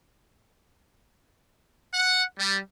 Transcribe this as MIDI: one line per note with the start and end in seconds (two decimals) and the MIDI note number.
1.92 2.22 78
2.38 2.59 55